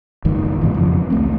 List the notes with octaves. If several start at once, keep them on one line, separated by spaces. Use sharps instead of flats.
F#1 E2 G#2 D#3
G#2 B2 E3
F2 C#3 E3 F3
E3
C#2 A3 C4